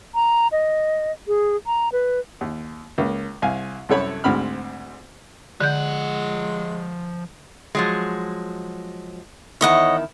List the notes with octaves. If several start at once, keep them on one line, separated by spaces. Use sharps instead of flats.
A#5
D#5
G#4
A#5
B4
D#2
C#2 A#3
C2 F5 G#5
C2 F#2 A4 C#5 B5
D2 G#2 C4 B5 F6
D3 F3 G#3 F#5 G6
F3 F#3 G#3
E2 D#3 E4 C#5 D#5 F#5